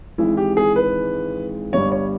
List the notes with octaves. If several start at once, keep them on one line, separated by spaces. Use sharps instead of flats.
G#1 G#2 E3 G#3 E4
G4
G#4
B4
G1 G2 G3 C#5
C#5